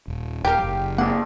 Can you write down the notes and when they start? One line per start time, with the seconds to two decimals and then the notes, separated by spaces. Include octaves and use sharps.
0.08 D#1
0.45 D#1 G4 A#4 F5 G5
0.62 F#1
0.98 A#3 G#4 F#5